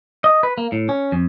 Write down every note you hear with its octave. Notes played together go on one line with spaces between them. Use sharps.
D#5
B4
A#3
A2
C#4
F2